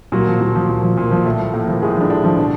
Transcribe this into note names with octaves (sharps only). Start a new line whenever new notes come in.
A#2 F#3 F#4
F3
A#2
F3
A#2
F3
A#2
F3
A2 A3 A4
F3
A2 A#3 A#4
F3
A2 G#3 G#4
D3 F3 D4
A2 D3 D4
F3
B2